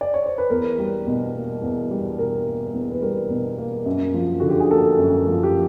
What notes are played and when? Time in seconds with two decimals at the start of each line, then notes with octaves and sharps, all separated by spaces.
0.01 D5
0.14 C#5
0.26 C5
0.38 B4
0.50 E2 A#4
0.78 G3
1.07 B2
1.34 A#3
1.62 E2
1.91 G3
2.18 B2 A#4
2.46 A#3
2.74 E2
2.91 B4
3.02 G3 A#4
3.30 B2
3.58 A#3
3.86 F#2
4.14 F3
4.40 D3 F#4
4.49 G4
4.60 G#4
4.71 A#3 A4
4.99 F#2
5.27 F3
5.43 G4